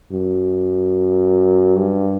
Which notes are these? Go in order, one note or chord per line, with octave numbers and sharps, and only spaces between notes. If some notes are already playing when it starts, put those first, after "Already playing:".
F#2
G2